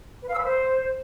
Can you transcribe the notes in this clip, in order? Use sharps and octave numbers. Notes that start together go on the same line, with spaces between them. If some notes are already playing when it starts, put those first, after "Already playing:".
B4
F5
E6
B4
C5